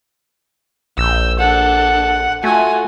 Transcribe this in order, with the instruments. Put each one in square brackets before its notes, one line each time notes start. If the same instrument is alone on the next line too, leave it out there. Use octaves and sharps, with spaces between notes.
[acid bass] A#1 [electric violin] E6 G6
[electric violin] D4 A4 [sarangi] F#5
[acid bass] A3 [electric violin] F4 F#4 [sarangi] G#5